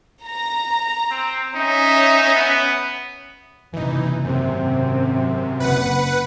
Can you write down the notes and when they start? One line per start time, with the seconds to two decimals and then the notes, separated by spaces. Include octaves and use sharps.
0.24 A#5
1.11 C4
1.56 C#4 D#4 C#5 E5
2.35 B3
3.73 F#1 C3 E3 D#4
4.24 G#1 F#2 C3 C4
5.60 F#1 B4 F#5